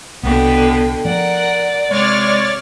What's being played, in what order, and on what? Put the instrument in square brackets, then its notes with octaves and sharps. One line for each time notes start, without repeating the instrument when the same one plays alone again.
[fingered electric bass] C2 [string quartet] B2 D3 G5 [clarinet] B3
[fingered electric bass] F3 A3 [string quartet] A#4 F#5 [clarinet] D5
[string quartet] C3 F6 [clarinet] G#3 [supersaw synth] C#5 D5 A6